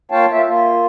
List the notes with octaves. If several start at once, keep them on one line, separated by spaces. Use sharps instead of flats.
A#3 F4 C#5 F5 G5 A5
F4 E5
A#3 F4